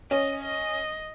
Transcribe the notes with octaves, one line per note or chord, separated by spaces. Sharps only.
C#4 D#5
D#5